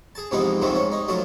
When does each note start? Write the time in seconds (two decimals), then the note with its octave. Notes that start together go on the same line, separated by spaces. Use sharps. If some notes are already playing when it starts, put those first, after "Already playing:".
0.15 G#4 A5
0.31 G#2 C3 E3 F3 B3 D#4
0.62 G#2 C3 D#3 F3 A3 C4
0.75 C#4
0.92 D#4
1.08 F3 F#3 A3 F4